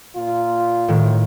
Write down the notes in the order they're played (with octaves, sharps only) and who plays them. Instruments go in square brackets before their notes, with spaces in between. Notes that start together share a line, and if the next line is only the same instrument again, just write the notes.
[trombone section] A#2 F4
[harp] A2 D#3